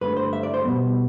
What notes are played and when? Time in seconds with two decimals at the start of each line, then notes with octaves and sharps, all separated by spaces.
0.01 G2 D3 A3 B4
0.17 C5
0.33 E5
0.43 D5
0.54 C5
0.65 B2 G3 B3